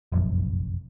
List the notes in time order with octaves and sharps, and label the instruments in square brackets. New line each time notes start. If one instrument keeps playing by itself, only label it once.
[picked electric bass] F1 A#1 F#2